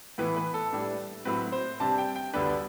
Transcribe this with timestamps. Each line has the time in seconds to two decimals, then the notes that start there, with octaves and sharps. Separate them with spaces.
0.18 A2 E3 B3 B4
0.36 B4
0.54 A4
0.72 A2 G3 D4
1.25 A2 F#3 C4 B4
1.52 C5
1.80 C3 G3 D4 A5
1.98 G5
2.16 G5
2.33 D2 D3 G3 B3 D4 B4